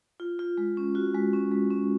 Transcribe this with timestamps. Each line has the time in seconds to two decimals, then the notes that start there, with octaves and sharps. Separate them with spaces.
0.20 F4
0.39 F4
0.58 G#3
0.77 C#4
0.95 F4 F#4
1.15 G#3
1.33 C#4
1.52 G#3
1.71 C#4